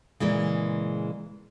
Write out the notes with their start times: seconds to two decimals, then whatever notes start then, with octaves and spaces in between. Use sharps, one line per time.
0.20 A#2 C#3 E3 G#3